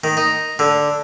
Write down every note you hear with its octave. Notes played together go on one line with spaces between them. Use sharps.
D#3
D#4
D3